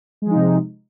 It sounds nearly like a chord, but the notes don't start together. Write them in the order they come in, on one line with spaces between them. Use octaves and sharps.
G#3 F3 D#4 C3